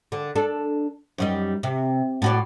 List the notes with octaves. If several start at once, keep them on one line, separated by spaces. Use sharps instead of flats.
D3
D4 A4
F#2 G3 D#4
C3
A2 F#4 D5